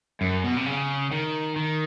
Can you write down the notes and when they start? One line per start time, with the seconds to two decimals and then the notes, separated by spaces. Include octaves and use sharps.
0.21 F#2
0.44 B2
0.57 C3
0.66 C#3
1.11 D#3
1.56 D#3